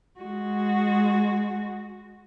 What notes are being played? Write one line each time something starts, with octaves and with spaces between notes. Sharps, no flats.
G#3 F#4